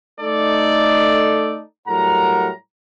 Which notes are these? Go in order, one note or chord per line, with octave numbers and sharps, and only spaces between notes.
A3 D#4 A4 D5
A2 F#3 G3 A#4 F#5 A#5